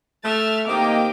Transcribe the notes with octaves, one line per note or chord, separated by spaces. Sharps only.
A3 E5 F6 A6
D#3 A#3 C4 D#4 G4 D#5 G5 D6